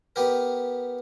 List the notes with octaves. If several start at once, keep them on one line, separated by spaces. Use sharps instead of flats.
B3 G4 A#4